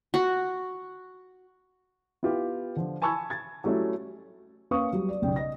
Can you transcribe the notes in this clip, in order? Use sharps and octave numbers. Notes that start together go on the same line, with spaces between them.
F#4
B3 E4 F4 G4
D3 F3
G#5 A5 B5 C#6 E6 G#6
G#6 A6
F#3 G3 A3 C#4 E4
A#3 C#4 B4 F5 C#6 D#6
F#3 G3
D5
B1 C#3 D5 G5
D#5 A#6